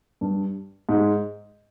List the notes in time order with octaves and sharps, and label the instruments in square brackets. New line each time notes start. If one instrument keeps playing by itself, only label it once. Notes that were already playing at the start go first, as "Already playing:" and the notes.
[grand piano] G2
G#2